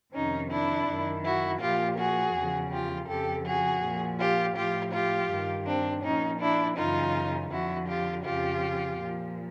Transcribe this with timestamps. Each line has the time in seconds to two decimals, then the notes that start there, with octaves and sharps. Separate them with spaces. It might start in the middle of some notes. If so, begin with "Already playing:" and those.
0.13 F2 C3 D#3 C#4 D#4
0.50 D4 E4
0.87 F#2 D#3
1.24 E4 F#4
1.61 A#2 F3 F4 G4
1.98 F#4 G#4
2.35 E2 C#3 F3
2.72 F4 G4
3.08 F2 C#3 F3 G4 A4
3.45 F#4 G#4
3.82 A#2 F3
4.19 F4 G4
4.56 A2 F3 F4 G4
4.93 F4 G4
5.30 G2 D#3
5.67 C4 D4
6.04 A#2 F3 C#4 D#4
6.40 D4 E4
6.77 F#2 C#3 E3 D#4 F4
7.51 F2 D3 F3 E4 F#4
7.88 F4 G4
8.25 F2 C#3 F3 F4 G4
8.99 A#2 F3